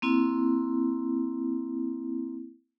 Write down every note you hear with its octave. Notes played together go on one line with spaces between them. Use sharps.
A#3 C4 E4